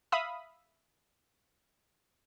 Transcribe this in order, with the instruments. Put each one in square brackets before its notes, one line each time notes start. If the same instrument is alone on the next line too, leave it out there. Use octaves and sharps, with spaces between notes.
[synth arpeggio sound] E5 F5 B5 D#6